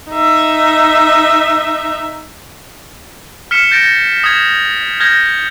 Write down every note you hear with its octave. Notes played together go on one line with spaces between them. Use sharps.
D#4 E5
F6 B6 C#7 E7
G6 A6 A#6 D7
D#6 G#6 E7
D#6 F6 G6 G#6 A#6